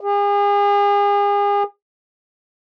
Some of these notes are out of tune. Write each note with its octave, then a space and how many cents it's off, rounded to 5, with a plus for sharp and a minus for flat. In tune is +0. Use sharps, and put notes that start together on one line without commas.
G#4 -40